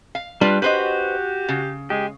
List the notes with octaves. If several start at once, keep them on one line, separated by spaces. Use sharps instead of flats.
F5
G3 D4 F4 B4
F#4 G4 B4 C5 D#5
C#3
G#3 G4